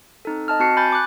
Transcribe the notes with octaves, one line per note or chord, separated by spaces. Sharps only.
C4 D#4 A4
D#5 A5 F6
C4 F#4 A5 C7 C#7
G#5 B5 G6 A6
D6 F#6